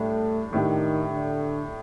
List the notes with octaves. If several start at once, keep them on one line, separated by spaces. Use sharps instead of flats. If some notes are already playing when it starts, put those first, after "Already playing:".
Already playing: A2 G3 A3 D4
A2 D#3 A3 D4 G4
D3